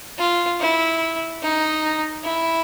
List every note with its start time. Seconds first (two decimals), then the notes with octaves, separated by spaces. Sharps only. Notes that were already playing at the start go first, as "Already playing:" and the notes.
0.19 F4
0.60 E4
1.42 D#4
2.24 E4